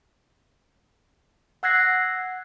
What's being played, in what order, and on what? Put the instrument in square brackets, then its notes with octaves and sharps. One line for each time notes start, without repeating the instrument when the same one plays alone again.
[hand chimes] F#5 E6 F#6 G#6 A#6 C7